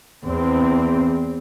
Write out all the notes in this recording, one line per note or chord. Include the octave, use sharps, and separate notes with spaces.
E2 C4